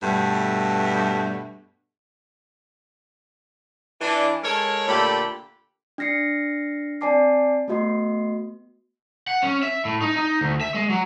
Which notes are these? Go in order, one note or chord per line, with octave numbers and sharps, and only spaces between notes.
G2 B2 A3 D4
E3 D4
G#3 A4 A#4 C#5
A#2 D3 A3 G4 A4 B5
D4 F6 A#6 C7 C#7
C4 D5 G#5 A5 D6 C7
A3 B3 F#4 D#5 C6 C7
F#5
C#4
E5
A2
D#4
D#4
D2
E5
G#3
F#3